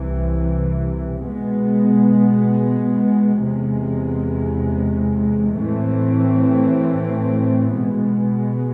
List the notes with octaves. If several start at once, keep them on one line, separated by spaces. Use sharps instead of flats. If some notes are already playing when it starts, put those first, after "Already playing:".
Already playing: C2 C3 E3
B2 G#3 B3
E2 C3 G#3
A2 E3 A3 C4
B2 G#3 B3